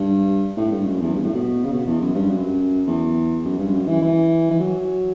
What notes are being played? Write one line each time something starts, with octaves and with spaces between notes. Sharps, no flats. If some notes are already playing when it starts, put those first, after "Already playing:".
Already playing: G2
A2
G2
F#2
E2
G2
A2
B2
C#3
B2
E2
F#2
G2
F#2
E2
F#2
G2
F#2
E3
E3
E3
F#3